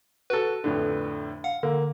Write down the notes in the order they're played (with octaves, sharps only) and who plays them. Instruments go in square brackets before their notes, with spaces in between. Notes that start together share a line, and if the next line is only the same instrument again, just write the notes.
[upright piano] F#4 A4 [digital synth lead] B4
[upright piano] F2 A2 D3
[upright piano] F5 [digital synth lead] F#5
[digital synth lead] D3 [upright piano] A#3